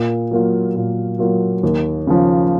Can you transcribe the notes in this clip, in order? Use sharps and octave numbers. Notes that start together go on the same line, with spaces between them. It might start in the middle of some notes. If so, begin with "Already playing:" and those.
Already playing: A#2
F#3 A#3 F4
A#2
F#3 A#3 F4
D#2
C#3 F3